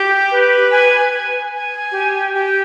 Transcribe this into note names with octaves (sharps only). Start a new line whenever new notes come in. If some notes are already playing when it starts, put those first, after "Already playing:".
Already playing: G4
B4
G#5
G#5
G#5
G4
G4